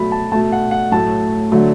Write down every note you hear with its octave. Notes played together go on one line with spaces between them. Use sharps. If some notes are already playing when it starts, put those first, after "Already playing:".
Already playing: B2 F#3 A3 B5
A5
B2 A3 A5
F#5
F#5
A2 F#3 A3 A5
D3 F#3 A3